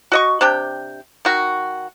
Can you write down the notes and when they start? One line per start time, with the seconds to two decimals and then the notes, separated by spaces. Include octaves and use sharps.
0.12 F#4 D#5 C#6
0.41 C3 D4 G5
1.25 D#3 F#4